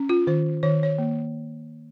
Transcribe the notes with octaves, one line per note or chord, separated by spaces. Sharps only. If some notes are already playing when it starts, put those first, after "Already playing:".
Already playing: C#4
F4
D#3 C5
D#3 C#5
C#5
A#3